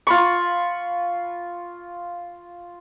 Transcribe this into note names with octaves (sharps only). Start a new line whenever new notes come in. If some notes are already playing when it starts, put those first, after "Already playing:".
F4 B5 C#6